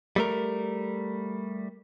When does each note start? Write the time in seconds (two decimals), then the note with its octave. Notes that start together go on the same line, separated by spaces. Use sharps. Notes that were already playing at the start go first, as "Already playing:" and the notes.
0.16 G3 A3 A#4